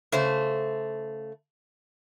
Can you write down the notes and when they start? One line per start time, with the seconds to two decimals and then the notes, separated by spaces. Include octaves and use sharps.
0.12 C#3 A3 C5